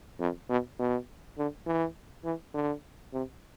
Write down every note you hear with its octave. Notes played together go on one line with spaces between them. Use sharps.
F2
B2
B2
D3
E3
E3
D3
C3